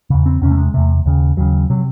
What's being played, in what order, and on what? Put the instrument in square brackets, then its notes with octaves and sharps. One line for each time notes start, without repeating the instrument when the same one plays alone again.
[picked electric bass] E2 C#3
C4
E2 C3 C#4
A3
G#3
E2 C3 A3
D#2 C#3
D#2 C#3 F#3
C3 F#3